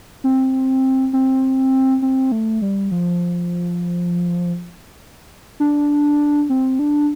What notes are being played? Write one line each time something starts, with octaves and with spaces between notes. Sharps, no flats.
C4
C4
C4
A3
G3
F3
D4
C4
D4